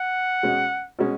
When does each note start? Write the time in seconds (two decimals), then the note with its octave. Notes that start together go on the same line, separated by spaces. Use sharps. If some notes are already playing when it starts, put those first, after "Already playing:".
Already playing: F#5
0.43 B2 G#3 C#4
0.99 B2 G#3 C#4